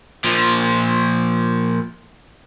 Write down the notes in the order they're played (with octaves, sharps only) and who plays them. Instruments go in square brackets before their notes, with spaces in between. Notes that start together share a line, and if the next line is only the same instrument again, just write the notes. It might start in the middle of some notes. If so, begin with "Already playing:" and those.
[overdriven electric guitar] A#2 F3